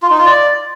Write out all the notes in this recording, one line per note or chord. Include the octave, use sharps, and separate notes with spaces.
F4
D#4
F4
D5